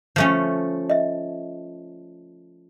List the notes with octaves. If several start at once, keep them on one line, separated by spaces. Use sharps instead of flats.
F3 A3 C#4
D#5 E5